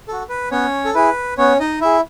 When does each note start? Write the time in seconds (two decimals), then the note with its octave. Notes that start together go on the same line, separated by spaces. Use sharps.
0.08 F#4 A4
0.29 B4
0.51 B3 C#4 C#5
0.85 A4
0.95 E4 G#4 B4
1.38 B3 C#4 C#5
1.60 D#4 D#5
1.81 E4 G#4 E5